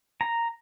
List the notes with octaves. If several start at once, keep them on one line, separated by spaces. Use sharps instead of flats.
A#5